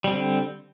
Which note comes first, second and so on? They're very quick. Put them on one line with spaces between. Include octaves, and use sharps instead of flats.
G3 C4 D3